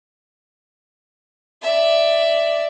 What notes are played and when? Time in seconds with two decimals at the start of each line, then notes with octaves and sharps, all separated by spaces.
1.62 D5 E5